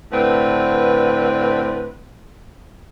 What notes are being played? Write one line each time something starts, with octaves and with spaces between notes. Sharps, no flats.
A2 D3 C4 B4